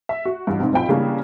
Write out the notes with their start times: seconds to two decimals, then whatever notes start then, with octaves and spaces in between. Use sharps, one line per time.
0.09 E5
0.25 F#4
0.47 A1 G2
0.60 G#2 C3
0.73 B1 C4 F4 G5 B5
0.89 C#3 E3 G3 A#3 C#4 D4